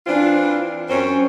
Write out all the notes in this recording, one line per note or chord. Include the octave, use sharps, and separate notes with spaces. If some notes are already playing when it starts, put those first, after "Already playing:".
E3 C4 D4 F4
F#2 C4 C#4